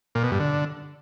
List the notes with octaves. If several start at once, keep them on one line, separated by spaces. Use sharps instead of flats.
A#2
B2
G2
D3